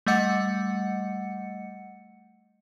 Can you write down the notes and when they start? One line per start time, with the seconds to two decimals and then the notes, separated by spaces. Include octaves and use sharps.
0.07 G3 A3 D#5 F#5 C#7